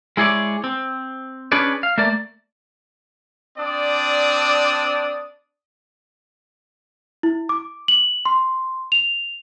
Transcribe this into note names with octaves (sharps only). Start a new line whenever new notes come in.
G#3 E4 G#4 C#5 D5
C4
C#4 D4 G#4 B4 C#5 D5
F5
A3 A#3 D5
C4 D4 D5 D#6
E4
D6
F#7
C6
F7